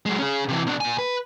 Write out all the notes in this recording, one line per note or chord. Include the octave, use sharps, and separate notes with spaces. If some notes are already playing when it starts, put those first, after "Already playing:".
F#3 G#3
C#4 G#4
C3 E3
B2 D4
A#2 G#5
B4